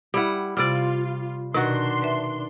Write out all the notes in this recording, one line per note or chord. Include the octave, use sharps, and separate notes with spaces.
G3 E4 F#5
C3 G3 F4 D5 F6
B2 D#3 D4 F#4 C6
B4 E5